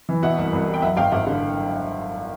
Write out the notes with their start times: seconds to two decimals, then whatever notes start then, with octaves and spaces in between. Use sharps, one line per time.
0.09 E3
0.22 B2 E5 F#5
0.38 C2
0.53 C2
0.68 G3
0.74 G5
0.82 F#2 E5 F#5
0.97 G#1 F5 G5
1.12 G#1 E5 F#5
1.26 D3